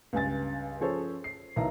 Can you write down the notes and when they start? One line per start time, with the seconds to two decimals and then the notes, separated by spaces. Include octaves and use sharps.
0.13 C#2 G2 G#5 A6
0.81 F3 C#4 G#4 A4 C5 C#5
1.24 C7
1.56 B1 D#3 E4 A#5